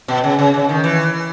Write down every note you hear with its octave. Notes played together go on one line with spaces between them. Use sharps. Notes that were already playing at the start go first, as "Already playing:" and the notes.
B2
C#3
C#3
C#3
D#3
E3